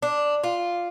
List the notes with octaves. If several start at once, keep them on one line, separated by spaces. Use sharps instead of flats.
D4
F4